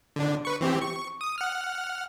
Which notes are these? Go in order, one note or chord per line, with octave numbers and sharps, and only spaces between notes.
D3 D4
B4 C#6
E3 C4 G4
C#6
D#6
F#5 F6